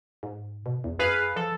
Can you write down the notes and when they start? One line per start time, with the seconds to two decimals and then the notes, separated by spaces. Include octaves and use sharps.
0.23 G#2
0.66 B2
0.84 E2
0.99 F#2 G#4 B4 F5
1.36 F3 A4